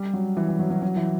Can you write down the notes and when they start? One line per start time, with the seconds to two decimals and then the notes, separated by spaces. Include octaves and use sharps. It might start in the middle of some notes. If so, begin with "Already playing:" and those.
Already playing: G3
0.13 F#3
0.37 E3
0.48 E3
0.59 F#3
0.70 F#3
0.82 F#3
0.97 E3